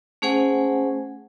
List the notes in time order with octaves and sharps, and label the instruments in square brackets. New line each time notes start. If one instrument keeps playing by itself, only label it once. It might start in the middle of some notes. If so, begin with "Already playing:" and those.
[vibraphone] A3 C#4 G#4 C5 F#5 G#5